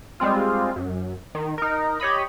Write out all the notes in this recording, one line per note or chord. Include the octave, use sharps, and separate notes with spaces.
G3 G#3 C4 F4
F#2
D#3
D#4 A#4
G4 C#5 D#5 B5